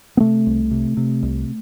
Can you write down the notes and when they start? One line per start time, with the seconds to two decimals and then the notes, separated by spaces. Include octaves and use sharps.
0.17 B3
0.20 C3 A3
0.46 C2
0.71 C3
0.97 C3
1.23 C2